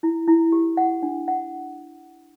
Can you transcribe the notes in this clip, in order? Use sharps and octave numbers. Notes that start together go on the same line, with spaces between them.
E4
E4
G4
F#5
D4
F#5